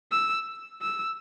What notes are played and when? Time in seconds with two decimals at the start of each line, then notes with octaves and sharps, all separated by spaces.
0.12 E6
0.82 E6